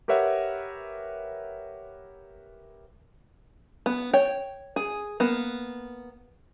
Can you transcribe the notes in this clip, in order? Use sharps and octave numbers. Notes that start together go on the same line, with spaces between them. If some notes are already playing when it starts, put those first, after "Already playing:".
G4 A#4 B4 C#5 E5 F#5
B3
C#5 G5
G#4
A#3 B3